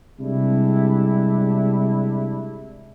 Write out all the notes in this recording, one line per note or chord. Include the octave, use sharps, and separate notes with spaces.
C3 G3 G#3 D4 E4